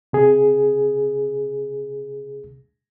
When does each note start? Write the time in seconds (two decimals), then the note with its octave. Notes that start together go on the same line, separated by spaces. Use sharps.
0.13 C3 G#4